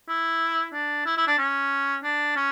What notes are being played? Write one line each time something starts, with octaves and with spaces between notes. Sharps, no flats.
E4
D4
E4
E4
D4
C#4
D4
C#4